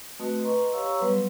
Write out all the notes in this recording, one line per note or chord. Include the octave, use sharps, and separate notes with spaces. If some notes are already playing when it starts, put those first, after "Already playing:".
A3 C4 F#4 B4 D#5 D#6
B4 D#5 A#5 C6 C#6
G4 C#5 F5 A#5 C#6 E6
F#3 G3 B3 B4 C6